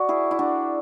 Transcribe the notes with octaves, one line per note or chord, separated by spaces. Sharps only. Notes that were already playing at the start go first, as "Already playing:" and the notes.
Already playing: F#4 D5
E4 G#4
E4
D4 F#4